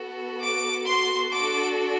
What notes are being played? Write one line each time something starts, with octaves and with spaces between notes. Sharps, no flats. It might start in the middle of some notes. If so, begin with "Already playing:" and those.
Already playing: B3 F#4 A4
D6
C6
D4 F#4 A4 D6